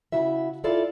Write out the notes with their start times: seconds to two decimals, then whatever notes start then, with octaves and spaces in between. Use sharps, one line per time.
0.12 C#3 E4 F#4 E5
0.64 E4 F4 A4 D5